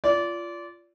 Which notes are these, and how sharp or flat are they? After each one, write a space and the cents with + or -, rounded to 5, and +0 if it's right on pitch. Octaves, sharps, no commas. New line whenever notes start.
F4 -15 D5 -25